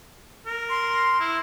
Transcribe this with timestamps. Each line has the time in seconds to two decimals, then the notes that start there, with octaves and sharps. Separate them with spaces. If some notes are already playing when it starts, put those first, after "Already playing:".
0.46 A#4
0.70 C6
1.20 E4